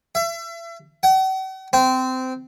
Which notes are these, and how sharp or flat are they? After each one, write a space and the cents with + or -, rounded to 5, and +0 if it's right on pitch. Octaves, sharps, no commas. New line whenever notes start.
E5 +35
F#5 +45
C4 -20